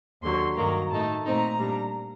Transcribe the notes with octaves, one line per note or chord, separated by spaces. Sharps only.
D#2 D3 F#3 C6
G2 D#3 F#3 A#3 A#5
A2 A3 D#4 A5
A#2 A3 C4 D#4 A#5
A#2 G3 D4